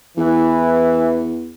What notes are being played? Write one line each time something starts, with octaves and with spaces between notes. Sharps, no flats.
E2 E3